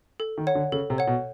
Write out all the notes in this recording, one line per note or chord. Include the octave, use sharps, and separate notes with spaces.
A4
D#3
C#5 F#5
D3
C#3 A4
C3
C#5 F#5
B2